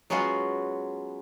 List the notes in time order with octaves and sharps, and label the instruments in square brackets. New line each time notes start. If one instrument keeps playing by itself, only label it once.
[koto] F#3 G#3 B3 C#4 F4 F#4